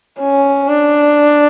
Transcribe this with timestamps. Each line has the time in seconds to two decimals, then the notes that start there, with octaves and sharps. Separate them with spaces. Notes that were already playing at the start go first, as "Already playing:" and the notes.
0.20 C#4
0.68 D4